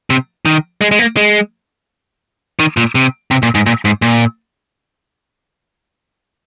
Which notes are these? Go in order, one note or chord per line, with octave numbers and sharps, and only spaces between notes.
C3
D#3
G#3
G#3
A#3
G#3
D#3
A#2
C3
C3
A#2
G#2
A#2
G#2
A#2